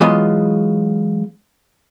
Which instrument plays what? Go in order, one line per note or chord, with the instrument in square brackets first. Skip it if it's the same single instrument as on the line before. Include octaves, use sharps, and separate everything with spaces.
[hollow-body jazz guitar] E3 F#3 G#3 B3 F4 D#5